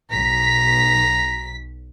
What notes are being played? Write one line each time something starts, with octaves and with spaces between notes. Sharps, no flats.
B1 A#5 B6